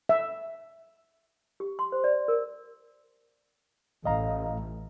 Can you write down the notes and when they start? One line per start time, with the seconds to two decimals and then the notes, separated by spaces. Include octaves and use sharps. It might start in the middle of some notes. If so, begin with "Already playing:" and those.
0.09 E5
1.60 G4
1.79 C6
1.92 C5
2.04 D5
2.28 A#4
4.05 A1 D#5 F5 A#5